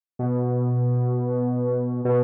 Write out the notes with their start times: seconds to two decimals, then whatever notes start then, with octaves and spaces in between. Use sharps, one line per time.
0.19 B2
2.05 B2